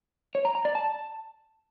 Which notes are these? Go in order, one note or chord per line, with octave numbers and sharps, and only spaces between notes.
C#5
A#5
A#5
D5
A5